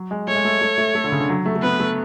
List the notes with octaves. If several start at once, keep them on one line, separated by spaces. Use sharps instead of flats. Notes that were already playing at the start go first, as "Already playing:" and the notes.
Already playing: F#3
G#3
A3 C#5
G#3
A3
A3
A3
A3
D3
C#3
D3
F#3
A3
A3
B3 B4
A3